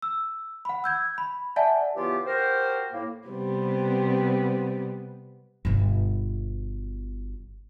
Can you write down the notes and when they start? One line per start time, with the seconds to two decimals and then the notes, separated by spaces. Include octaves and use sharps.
0.02 E6
0.65 F#5 B5
0.84 E6 G6 G#6
1.18 B5
1.56 D5 E5 F#5 G#5 A5
1.96 C#3 E3 B3 F4 G4
2.26 F#4 G4 A#4 C5
2.93 A2 A#3
3.28 C3 G3 B3 C4
5.65 G1 B2